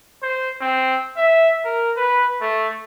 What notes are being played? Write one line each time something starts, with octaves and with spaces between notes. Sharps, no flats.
C5
C4
E5
A#4
B4
A3